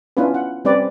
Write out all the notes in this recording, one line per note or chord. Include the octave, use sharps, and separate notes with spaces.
B3 C#4 D4 E4 F4 B4
F#5
G3 C4 C#4 B4 D5